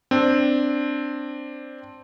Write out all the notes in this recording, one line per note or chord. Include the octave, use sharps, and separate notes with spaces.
C4 D4